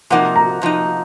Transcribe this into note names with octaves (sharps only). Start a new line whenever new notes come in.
C3 F3 A#3 D#4 F#5
A#5
C3 F3 A#3 D#4